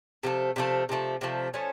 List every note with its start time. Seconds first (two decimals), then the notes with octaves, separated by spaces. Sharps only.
0.23 C3 F3 A3
0.56 C3 F3 A3
0.89 C3 F3 A3
1.21 C3 F3 A3
1.54 F3 A3 C#4